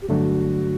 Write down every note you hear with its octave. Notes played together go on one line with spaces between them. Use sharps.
G4
G2 D3 F#3 A3 D4 F#4